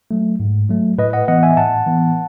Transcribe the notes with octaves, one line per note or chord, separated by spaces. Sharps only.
F#3 A3
G#2
F#3 A3
A2 B4 D#5
D#5 F#5
E3 B3 D#5 F#5
E5 G#5
A2 F#5 A5
E3 B3